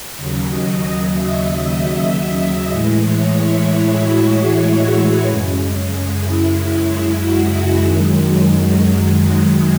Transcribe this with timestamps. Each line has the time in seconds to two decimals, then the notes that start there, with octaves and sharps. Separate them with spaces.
0.16 D#2 C#3 F#3 C#5
0.48 D#5
0.80 D#5
1.12 E5
1.43 D#5
2.07 E5
2.71 A2 E3 G#3 D#5
3.03 C#5
3.34 E4
3.98 F#4
4.30 G#4
5.25 F#2 C#3 G#3
6.21 E4
7.16 F#4
7.47 E4
7.79 F#2 D#3 F#3 G#3